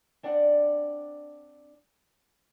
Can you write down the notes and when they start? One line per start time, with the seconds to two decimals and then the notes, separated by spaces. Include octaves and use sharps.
0.23 C4 D4 D5 F#5